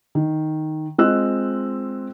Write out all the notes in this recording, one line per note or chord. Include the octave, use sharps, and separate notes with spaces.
D#3
G#3 C4 F4 D#5 E6 F#6